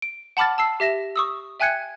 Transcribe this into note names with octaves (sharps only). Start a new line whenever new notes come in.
D7
F#5 A5 B5 D6 F6 A6
A5 E6 C7
G4 E5 A#6 E7
C#6 D#6 E6
E5 G5 G#5 F#6 G#6 C#7